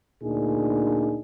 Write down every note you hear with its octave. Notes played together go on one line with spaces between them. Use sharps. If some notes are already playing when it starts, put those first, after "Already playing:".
D2 A#2 D4 D#4 G#4